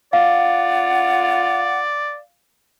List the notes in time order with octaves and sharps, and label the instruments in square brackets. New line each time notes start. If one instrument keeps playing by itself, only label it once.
[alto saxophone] F4 [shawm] D5 [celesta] F5 [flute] F#5